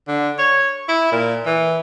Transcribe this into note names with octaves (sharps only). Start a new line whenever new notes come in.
D3
C#5
E4
A#2
E3